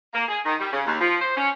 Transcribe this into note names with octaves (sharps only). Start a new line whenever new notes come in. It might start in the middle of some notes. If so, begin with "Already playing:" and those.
A#3
G#4
D#3
G3
C#3
D#2
F3
C5
C#4